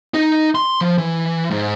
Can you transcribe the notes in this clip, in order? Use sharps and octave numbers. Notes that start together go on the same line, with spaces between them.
D#4
C6
F3
E3
G#2